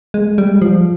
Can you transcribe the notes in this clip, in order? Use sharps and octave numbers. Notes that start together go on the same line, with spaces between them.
G#3
G3
F3